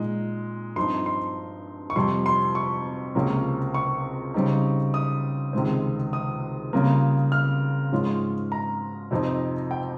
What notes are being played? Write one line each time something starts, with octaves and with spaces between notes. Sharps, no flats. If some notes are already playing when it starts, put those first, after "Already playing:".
Already playing: A#2 G#3 D#4
G2 F3 C4 D#4 C6
C6
C#6
F2 C3 G3 C6
C6
C#6
C#2 C3 F3 A#3 C#4
C#6
C#3 G3 C4 D#4
D#6
C#2 C3 D#3 G#3 C4
D#6
C#3 G3 A#3 F4
F6
G#2 F3 G#3 C#4 F4
A#5
F2 C3 F3 C4 D#4
G5